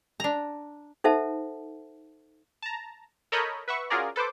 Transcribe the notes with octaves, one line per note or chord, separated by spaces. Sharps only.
D4 A#5
D#4 A4 C5 E5 F#5 A5
A5 A#5
A4 A#4 C#5 D#5 B5 G6
B4 E5 F#5 C#6
C#4 F4 F#4 G#4 A#4 D5
A4 B4 C5 D6